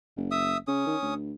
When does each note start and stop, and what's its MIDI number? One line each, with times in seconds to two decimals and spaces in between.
0.16 0.56 30
0.31 0.57 76
0.31 0.57 87
0.67 0.85 49
0.67 1.14 61
0.67 1.14 87
0.86 0.96 51
1.02 1.33 38